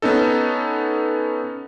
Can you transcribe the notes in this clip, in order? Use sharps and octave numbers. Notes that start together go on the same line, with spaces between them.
B3 C#4 D#4 A4